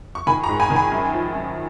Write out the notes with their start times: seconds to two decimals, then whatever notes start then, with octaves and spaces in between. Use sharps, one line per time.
0.15 C#6
0.27 D#3 G#5 B5
0.43 A#5 C#6
0.49 G#2
0.60 G#5 B5
0.70 D#3
0.76 G#5 B5
0.92 F#2
1.13 F3
1.35 F#2